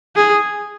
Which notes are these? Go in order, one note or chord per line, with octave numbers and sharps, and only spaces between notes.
G#4